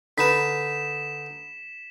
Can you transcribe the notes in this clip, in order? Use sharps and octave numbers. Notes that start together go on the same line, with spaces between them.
D3 D#4 B4 B6 E7